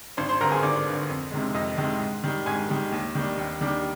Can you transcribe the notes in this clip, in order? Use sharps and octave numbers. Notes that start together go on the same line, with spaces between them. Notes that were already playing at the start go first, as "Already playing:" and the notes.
G#1 C5 C6
C5 C6
G2 D3 A#4 A#5
G#4 G#5
G#1 D5 D6
G2 D3
F2
C3 D#3 G#3
F2 D#5 D#6
C3 D#3 G#3
G#2
D#3 G3
G#2 G#5 G#6
D#3 G3
D#2
D#3 G3 D4
D#2
D#3 G3 D4